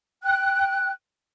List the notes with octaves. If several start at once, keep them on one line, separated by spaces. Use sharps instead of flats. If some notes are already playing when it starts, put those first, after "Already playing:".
G5 F#6